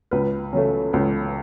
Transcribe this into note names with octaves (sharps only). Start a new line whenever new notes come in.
C#2 B4
C#3 F#3 A3
C#2